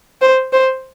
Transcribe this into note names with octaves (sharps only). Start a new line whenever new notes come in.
C5
C5